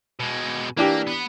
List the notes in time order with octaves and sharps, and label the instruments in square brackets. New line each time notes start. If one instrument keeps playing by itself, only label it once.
[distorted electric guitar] B2 G#3
[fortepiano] E3 D4 G4 [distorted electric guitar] A#3
[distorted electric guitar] B3